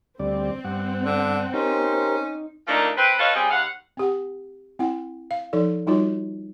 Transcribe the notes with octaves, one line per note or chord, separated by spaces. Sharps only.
D2 G3 C4 D5
G2 F#5
D3
C#4 D#4 G4 A#4 C5
F3 A3 A#3 D4 D#4 A#4
C4 B4
F4 A4 B4 C#5 D#5 F5
G3 C4 G#4
D#2 D#3 F5 F#5
C4 G4 F#5
C4 E4 F#5
F5
F3 D#4 A4 D5
G3 D#4 F4 F#4 C#5